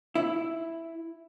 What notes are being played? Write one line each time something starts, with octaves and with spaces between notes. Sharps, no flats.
E4